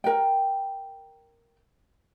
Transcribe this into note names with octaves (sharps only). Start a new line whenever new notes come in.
A#4 G5